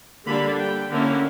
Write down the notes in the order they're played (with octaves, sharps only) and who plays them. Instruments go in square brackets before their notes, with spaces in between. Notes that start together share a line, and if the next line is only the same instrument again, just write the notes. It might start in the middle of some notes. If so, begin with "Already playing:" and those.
[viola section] D3 G3 A#3 D4 B5
G5
D3 A#3 C#4 E4